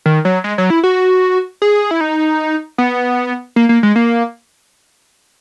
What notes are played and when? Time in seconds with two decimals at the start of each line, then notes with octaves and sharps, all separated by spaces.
0.06 D#3
0.25 F#3
0.44 G#3
0.58 F#3
0.70 E4
0.83 F#4
1.62 G#4
1.91 E4
2.01 D#4
2.78 B3
3.56 A#3
3.69 A#3
3.83 G#3
3.96 A#3